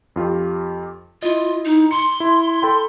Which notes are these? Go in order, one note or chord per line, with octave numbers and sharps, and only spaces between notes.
F2 F4 G4
E4 F4 D#5
D#4
C6 C#7
E4
A4 G5 B5